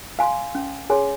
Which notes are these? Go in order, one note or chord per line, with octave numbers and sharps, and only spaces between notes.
F5 G#5 C6
C#4
G#4 C#5 G#5 C6